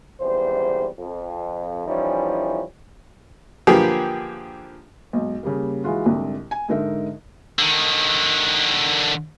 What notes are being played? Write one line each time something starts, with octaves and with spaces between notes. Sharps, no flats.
G#1 E2 C#3 G3 C5
F2
E3 F3 G3 C#4 D#4 E4
D3 F3 A#3 B3 G4 G#4
B1 G#2
C#3 G3 A#3
E3 G#3 F4 F#4
C2 G#2 D3
G#5
G#2 D3 D#4 A#4 E5
D3 D#3